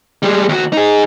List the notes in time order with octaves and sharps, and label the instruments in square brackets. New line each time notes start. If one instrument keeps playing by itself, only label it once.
[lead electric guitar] G3 G#3
D#2 F#4
D#4 G#4